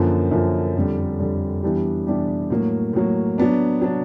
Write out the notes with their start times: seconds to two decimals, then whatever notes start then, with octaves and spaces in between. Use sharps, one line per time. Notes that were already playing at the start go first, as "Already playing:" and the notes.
Already playing: F#2 D3 F3 A#3
0.31 F#2 D3 F3 A#3
0.76 F2 D3 G3
1.20 F2 D3 G3
1.63 E3 G3 B3 D4 G4
2.07 E3 G3 B3 D4 G4
2.50 A2 F#3 A#3
2.93 A2 F#3 A#3
3.38 F#3 B3 D4
3.82 F#3 B3 D4